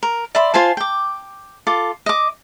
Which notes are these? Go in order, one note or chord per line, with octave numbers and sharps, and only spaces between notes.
A#4
D5 E5 B5 C6
F4 C5 G#5 A5
G5 D6
F4 A4 D6
D#5 D6